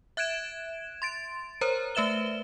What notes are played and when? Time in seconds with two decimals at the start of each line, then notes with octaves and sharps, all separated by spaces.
0.17 E5 F#6 G#6 D7 E7
1.02 C6 A6 D7
1.61 A#4 C5 C#5 A#5
1.95 A3 B4 E5 E7 G7